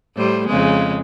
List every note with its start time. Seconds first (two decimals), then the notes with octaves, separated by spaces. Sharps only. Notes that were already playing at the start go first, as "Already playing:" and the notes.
0.16 A2 G3 C5
0.47 F2 C#3 G#3